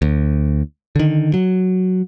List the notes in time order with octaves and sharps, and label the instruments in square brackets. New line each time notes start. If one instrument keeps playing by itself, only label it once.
[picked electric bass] D2
D3 D#3
F#3